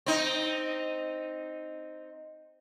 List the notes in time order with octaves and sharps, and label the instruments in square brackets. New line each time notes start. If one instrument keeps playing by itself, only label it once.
[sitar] C4 D#4